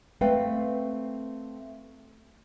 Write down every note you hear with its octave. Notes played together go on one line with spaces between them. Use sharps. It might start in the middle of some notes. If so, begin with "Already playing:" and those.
A3 C4 B4 F5 G5